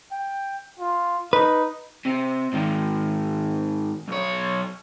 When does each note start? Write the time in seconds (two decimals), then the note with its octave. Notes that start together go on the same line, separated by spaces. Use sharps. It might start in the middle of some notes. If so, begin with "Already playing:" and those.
0.12 G5
0.79 F4
1.33 D#4 B4
2.05 C3
2.53 G#2 D#3
4.08 B1 C#5